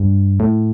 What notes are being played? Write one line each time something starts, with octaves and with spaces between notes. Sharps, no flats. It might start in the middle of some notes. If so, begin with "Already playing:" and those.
Already playing: G2
A2